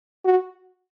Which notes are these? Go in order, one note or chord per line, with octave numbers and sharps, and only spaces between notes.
F#4